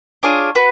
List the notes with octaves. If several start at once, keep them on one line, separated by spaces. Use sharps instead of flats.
D4 F4 G#4 C#5
F#4 B4